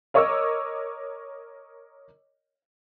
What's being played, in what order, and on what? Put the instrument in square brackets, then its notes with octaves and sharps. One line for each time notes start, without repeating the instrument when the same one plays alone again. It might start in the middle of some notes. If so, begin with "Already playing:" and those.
[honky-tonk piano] A#4 C#5 D#5 C#6 D6 E6